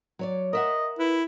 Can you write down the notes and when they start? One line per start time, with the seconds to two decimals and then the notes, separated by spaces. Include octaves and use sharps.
0.19 F#3 C#5 D5
0.53 A#4 D#5 E5 F#5
0.99 E4 B4